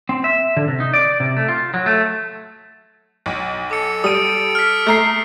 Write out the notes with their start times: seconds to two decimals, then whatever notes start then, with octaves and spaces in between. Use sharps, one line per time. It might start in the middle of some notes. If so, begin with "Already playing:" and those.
0.09 C4
0.24 E5
0.57 D3
0.68 C3
0.80 D#4
0.94 D5
1.20 C3
1.37 A3
1.49 F4
1.74 F#3
1.86 A3
3.26 B1
3.71 A4 D6 C#7
4.04 G3 D#6 D7 D#7
4.55 F6 B6
4.87 A3 A#5 C7